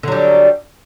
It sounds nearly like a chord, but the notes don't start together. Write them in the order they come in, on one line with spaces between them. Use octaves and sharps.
D3 F#3 G3